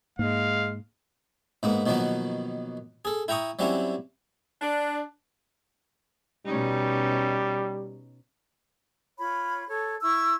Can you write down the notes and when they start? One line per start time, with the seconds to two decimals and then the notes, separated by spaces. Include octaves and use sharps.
0.19 G#2 G#3 A#3 F5
1.63 G#2 A#3 B3
1.86 B2 D#3 F3 F#3 A#3 B3
3.05 G#4 A4
3.28 E4 G5 A#5 C#6 D#6
3.59 F#3 G3 C4 C#4 E4
4.61 D4
6.46 B2 G3 C#4 D#4
9.18 F4 C#5 B5
9.68 A4 C#5
10.02 E4 C#6 E6